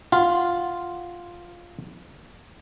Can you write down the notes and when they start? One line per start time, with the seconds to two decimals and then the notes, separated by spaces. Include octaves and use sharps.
0.12 F4 F#5 C6